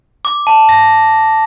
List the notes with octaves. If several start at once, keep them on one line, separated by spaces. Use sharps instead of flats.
D6
A5
A#6